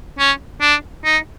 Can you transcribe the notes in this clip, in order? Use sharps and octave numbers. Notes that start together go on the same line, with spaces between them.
C#4
D4
D#4